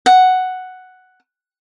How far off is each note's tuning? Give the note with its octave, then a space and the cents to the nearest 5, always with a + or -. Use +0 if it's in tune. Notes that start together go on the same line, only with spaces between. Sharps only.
F#5 +5